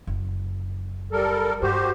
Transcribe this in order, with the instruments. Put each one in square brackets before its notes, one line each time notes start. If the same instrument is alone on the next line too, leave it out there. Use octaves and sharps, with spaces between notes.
[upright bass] F#1
[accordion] G3 A4 A#4
[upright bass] G2 [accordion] F#4 G4 C5